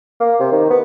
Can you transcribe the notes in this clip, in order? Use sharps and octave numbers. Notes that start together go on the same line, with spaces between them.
A#3
C3
D#3
B3